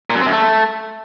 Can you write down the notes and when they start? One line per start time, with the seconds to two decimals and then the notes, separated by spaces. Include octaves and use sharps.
0.10 A#2
0.16 F#2
0.21 C4
0.26 F#2
0.32 A3